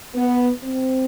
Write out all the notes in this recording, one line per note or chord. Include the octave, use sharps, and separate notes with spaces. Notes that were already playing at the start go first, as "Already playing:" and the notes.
B3
C4